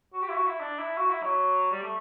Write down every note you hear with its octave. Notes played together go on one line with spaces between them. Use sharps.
F#4
G4
E4
F#4
E4
D4
E4
F#4
E4
F#3
G3
A3